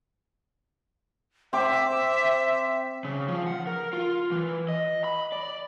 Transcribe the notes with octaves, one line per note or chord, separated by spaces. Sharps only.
C4 E5 D6
C#3
F3
F#5
A#4
F4
E3
D#5
B5
D5